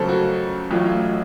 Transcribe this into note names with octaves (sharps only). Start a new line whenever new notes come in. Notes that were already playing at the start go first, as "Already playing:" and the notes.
Already playing: F2 C#3 F#3 A#3 A4 C5
F#4
A1 A2 F#3 A3 F4
F4